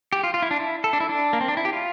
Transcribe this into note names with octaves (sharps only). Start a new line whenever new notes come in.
G4
F4
F4
E4
D4
E4
A4
D4
E4
D4
A#3
C4
D4
E4
G4
F4